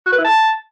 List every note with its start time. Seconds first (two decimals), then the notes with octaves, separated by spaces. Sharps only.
0.06 F#4
0.12 B4
0.18 E4
0.24 A5